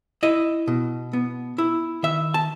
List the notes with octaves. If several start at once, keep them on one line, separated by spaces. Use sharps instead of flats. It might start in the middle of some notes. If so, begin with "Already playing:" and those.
E4 D#5
B2
B3
E4
D#3 E5
A5